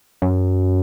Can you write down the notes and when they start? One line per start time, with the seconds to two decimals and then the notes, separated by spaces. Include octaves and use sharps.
0.22 F#2